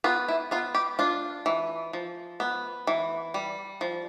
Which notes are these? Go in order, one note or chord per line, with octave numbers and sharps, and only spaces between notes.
B3 F4
E4
B3 F4
G4
D4 F4
E3
F3
B3
E3
G3
F3